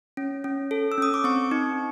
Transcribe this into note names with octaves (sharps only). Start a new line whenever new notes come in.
C#4
C#4
A4
E6
C#4 D#6
D6
C4 C#6
D#4